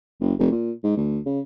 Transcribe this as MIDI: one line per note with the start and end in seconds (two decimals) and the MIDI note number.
0.21 0.33 30
0.39 0.51 29
0.51 0.72 46
0.84 0.95 44
0.97 1.18 38
1.26 1.40 49